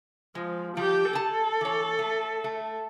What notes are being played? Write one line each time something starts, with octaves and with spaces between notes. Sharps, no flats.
F3 G#3
F3 G3 G4 G5
G#4 A4 A5
E3 C#5
A3
A3